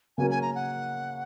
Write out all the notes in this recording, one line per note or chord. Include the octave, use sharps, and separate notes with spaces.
C#3 F#3 A#3 C#4 A#4 G#5
G#5
A#5
F#5